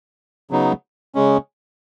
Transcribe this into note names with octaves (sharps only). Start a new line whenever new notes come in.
C#3 F#3 B3 D#4
C#3 G#3 C#4